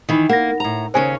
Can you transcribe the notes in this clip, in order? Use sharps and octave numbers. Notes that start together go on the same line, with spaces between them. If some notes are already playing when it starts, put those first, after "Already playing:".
D#3 E3
A#3 F#5 A#6
A2 A#5
D#2 C#3 C#4 C5 G#5